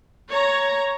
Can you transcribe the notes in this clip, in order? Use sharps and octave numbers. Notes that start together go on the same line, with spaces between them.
C#5 A#5